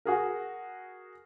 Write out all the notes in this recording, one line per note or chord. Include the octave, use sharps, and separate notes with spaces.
F#4 G#4 A#4